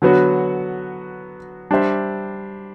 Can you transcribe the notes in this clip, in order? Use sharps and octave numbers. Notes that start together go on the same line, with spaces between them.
D3 F#3 B3 F#4
G3 D4 G4 C5 E5